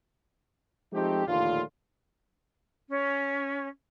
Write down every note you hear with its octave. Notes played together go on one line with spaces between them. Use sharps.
F3 G#3 A3 C4 D#4 G4
A#1 D#2 A2 D3 A3 F4
C#4